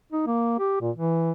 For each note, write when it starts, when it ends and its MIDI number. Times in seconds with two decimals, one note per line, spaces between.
0.13 0.23 63
0.27 0.56 58
0.59 0.80 67
0.81 0.91 46
0.96 1.32 52